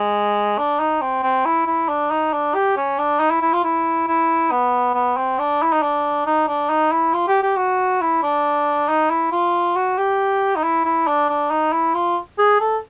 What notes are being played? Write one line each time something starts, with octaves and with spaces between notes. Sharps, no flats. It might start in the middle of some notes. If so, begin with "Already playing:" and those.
Already playing: G#3
D4
D#4
C4
C4
E4
E4
D4
D#4
D4
G4
C#4
D4
D#4
E4
E4
F4
E4
E4
B3
B3
C4
D4
E4
D#4
D4
D#4
D4
D#4
E4
F4
G4
G4
F#4
E4
D4
D#4
E4
F4
F#4
G4
D#4
E4
E4
D4
D4
D#4
E4
F4
G#4
A4